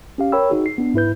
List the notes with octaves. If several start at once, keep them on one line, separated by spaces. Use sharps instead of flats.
C#4 G4 F5
A#4 C#5 G5 B5 E6
D#4 F#4 G#4
C7
B3 D4
G#2 E4 B4 G6